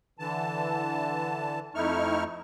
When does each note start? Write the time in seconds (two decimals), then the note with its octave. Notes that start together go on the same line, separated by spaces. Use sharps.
0.19 D3 E3 A5
1.75 F2 A3 D#4 E4 C#6 F6